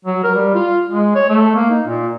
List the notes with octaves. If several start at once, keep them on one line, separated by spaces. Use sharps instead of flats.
F#3
A#4
G3
F4
G#3
C#5
A3
A#3
D#4
A#2